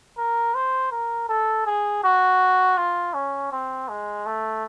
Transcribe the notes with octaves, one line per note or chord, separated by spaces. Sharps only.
A#4
C5
A#4
A4
G#4
F#4
F4
C#4
C4
G#3
A3